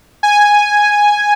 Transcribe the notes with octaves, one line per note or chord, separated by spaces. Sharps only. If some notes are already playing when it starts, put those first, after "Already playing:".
G#5